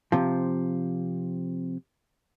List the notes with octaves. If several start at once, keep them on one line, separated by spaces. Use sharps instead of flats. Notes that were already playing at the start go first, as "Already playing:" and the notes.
C3 F3